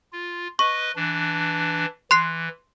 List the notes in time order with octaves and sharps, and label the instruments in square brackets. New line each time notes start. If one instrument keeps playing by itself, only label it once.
[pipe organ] F4
[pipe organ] B4 D#5 [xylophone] C#6
[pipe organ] E3 D4
[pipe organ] E3 [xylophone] C6 F#6 C7